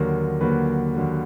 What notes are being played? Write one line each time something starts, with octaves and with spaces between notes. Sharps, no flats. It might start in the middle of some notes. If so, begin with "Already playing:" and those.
Already playing: D#2 D3 F#3 A#3 A#4
D#2 D3 F#3 A#3 B4
D#2 D3 F#3 A#3